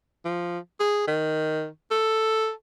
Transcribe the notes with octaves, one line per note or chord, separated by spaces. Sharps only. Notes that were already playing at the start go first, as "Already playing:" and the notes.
F3
G#4
D#3
A4